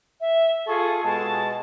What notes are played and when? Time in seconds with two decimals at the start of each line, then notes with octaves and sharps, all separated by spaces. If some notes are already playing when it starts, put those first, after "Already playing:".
0.21 E5
0.67 F4 G#4 A4 C#6
1.03 B2 G#3 A5